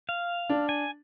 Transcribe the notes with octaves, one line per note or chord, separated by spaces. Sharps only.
F5
D4
G#5